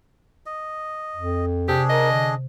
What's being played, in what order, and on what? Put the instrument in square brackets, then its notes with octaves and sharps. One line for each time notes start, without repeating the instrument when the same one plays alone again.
[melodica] D#5
[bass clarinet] F2
[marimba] C3 [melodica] D4 G#4 [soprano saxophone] G4
[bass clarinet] A#4 [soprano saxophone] D#5
[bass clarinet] D3